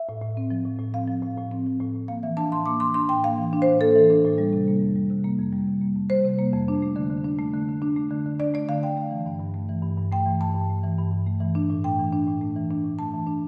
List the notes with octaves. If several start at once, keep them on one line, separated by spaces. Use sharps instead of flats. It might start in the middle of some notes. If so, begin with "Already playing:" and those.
Already playing: E5
A2
A2
C4
F3
A2
A2
C4 F5
F3
A2
A2
C4
F3
A2
A2
A#3 F5
E3 E5
D4 A5
A2 C6
A#3 D6
E3 C6
D4 C6
A2 G5
A#3 F5
E3
D4
A2 C5
A#3 A4
E3
D4
A2
G3
C3
A#3
F2
G3
C3
A#3
F2
G3
C3
A#3
F2
G3 C5
C3
A#3
F2
D4
A3
D3
D3
D4
A3
D3
D3
D4
A3
D3
D3
D4 D5
A3 D5
D3 F5
D3 G5
A3
E3
G2
G2
A3
E3
G2
G2
A3 G5
E3
G2 A5
G2
A3
E3
G2
G2
A3
E3
D4
A2
A3 G5
E3
D4
A2
A3
E3
D4
A2
A3 A5
E3
D4